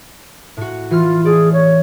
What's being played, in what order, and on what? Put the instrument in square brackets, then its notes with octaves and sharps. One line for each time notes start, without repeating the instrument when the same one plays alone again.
[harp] A2 F#4
[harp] E3 F6 [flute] F4
[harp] A3 D5 [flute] G#4
[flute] C#5